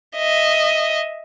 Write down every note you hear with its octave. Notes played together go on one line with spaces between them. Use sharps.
D#5 E5